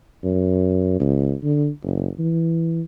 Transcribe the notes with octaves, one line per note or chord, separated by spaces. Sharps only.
F#2
C#2
D3
F#1
E3